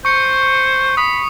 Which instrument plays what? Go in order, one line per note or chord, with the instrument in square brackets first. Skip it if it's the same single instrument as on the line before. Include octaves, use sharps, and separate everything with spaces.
[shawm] C5 [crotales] C#6 C#7
[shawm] B5 [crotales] D#6